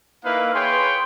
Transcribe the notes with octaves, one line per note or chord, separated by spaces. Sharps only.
A#3 D#4 E4 B4 F5
G#4 B4 C#5 G5 C6